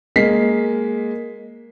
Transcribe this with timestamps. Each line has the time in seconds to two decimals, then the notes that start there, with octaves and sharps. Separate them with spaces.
0.16 G#3 A#3 B6 C7